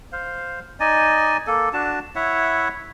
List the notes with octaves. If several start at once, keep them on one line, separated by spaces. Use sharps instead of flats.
C5 F5
D#4 D5 D#5 G#5
A#3 A4
D4 F#4 A5
E4 C#5 E5 F#5